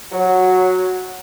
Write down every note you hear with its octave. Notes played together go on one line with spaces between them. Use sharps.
F#3